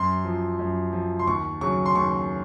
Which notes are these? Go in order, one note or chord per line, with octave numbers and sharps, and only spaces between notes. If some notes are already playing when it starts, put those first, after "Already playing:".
Already playing: F#2 C6
F3
F#2
F3
C6
D#2 C#6
C#3 F#3 C#6
C6
D#2 C#6